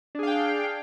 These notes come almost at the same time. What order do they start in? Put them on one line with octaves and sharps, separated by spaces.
D4 G#4 F5 G5